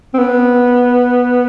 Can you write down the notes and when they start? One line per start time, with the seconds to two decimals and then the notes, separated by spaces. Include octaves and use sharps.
0.14 C4
0.18 B3